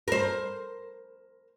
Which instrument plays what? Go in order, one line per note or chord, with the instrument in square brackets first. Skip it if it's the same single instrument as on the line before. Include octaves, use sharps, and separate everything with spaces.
[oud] A#4 C5